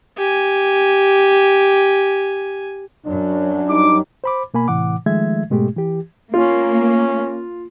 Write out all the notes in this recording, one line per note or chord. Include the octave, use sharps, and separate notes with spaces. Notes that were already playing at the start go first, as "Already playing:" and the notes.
G4 G#5
F#2 F#3 D4
G3 D#4 D6
C5 B5 D6
B2 A#3 G#5 B5
A2 C3 E3 F#5 D6
D#3 F3 G#3 A3 E5 G#6
G#2 B2 G#3 A3 G4
E3 G4
A#3 C#4 F4